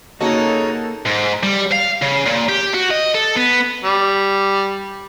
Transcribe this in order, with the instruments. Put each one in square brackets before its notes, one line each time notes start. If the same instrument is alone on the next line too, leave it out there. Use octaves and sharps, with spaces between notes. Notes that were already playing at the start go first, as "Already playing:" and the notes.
[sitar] C#3 C#4 D#5 [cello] A#3 [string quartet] D#4 [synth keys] F#4 A4 A#4
[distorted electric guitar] G#2
G3
F5
C#3
A#2
G4
F#4
D#5
A4
B3
[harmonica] G3